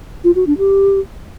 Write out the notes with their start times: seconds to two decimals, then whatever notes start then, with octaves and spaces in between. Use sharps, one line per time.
0.24 F4
0.36 F#4
0.47 D4
0.58 G4